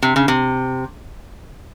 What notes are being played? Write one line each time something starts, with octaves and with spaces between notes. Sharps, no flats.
C3
C#3
C3